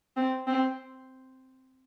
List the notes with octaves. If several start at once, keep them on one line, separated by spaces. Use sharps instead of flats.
C4
C4